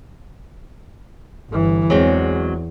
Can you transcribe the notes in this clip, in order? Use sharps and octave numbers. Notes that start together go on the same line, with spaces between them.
G1 E3
E2 F#3 G#3 C4